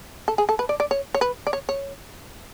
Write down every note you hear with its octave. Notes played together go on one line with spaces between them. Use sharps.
A4
G#4
A4
B4
D5
D5
C#5
C#5
B4
D5
C#5
C#5